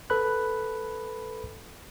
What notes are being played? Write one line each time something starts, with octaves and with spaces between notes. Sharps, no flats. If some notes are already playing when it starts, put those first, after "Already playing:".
A4 B4 B5 F#6